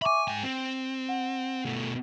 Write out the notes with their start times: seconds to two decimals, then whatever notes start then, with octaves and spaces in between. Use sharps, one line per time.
0.02 E5 G#5 B5 C#6 D6
0.28 G#2 G5 G#5
0.43 C4
1.09 F#5
1.66 B2 A3